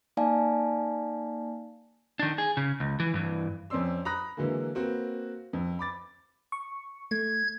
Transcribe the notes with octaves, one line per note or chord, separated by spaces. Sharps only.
A#3 D#4 D5 F5 G#5 A5
D#3 D4
G#4
C#3
C#2
E3
G2 E3
F2 C4 C#4 D5 C6 E6
A#5 B5 D#6 F#6 A#6
D3 E3 F#3 G#3 A#3
A#3 C4 F#4 B4
F2
B5 D6 A6
C#6
A3 G#6